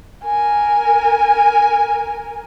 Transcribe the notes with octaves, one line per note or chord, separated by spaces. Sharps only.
A#4 G#5